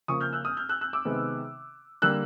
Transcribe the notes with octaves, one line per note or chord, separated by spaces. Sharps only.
C#3 F3 A#3 C#6 D#6
F6 G6
E6 F#6
D#6 F6
F6 G6
E6 F#6
E6 F#6
D6 E6
C3 D#3 G#3 B3
D3 G3 A#3 E6 F#6